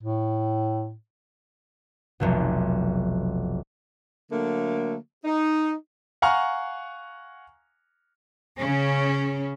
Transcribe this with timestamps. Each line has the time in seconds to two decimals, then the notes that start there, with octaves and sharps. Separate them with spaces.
0.03 A2
2.20 F1 B1 B2
4.31 D3 F#3 A3 A#3
5.25 D#4
6.22 F5 F#5 G#5 A#5 C#6 F6
8.58 C#3 C#4